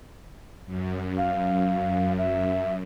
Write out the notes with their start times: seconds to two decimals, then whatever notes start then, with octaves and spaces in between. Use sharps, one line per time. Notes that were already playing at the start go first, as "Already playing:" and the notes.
0.66 F#2
1.18 F5
2.18 E5